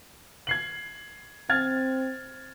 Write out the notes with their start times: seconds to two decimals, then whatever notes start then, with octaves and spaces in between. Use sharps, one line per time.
0.47 G#6 C7 F#7
1.50 C4 F6 G#6 A6